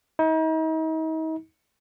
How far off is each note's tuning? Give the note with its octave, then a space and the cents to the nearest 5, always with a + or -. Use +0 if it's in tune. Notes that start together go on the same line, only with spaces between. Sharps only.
D#4 +40